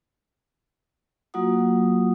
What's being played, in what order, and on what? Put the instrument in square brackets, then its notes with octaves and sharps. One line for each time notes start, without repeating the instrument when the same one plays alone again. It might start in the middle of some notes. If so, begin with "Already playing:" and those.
[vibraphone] F#3 A#3 F4 F#4 F#5 D#6